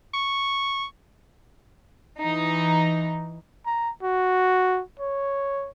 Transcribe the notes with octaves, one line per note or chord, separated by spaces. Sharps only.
C#6
E3 D#4
A#5
F#4
C#5